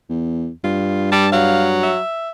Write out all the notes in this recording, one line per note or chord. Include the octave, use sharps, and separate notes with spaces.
E2
G2 F4
G3 A5
F#3 F5
E5